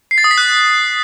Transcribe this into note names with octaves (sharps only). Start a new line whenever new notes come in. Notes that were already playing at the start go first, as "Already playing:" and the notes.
C7
A6
D#6
B6
F#6